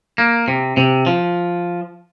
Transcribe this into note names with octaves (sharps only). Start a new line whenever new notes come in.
A#3
C3
C3
F3